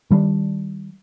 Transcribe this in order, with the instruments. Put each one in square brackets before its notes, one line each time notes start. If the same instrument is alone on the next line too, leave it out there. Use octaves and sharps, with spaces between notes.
[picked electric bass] D#3 G3 A3 D4